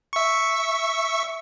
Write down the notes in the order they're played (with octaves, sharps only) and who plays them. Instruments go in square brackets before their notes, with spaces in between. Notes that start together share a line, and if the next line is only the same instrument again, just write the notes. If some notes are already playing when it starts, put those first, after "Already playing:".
[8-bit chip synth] E5 C#6